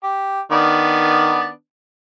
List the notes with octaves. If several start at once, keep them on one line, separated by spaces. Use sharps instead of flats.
G4
D#3 B3 D4